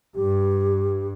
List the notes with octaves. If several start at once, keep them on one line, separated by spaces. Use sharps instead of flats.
G2 G4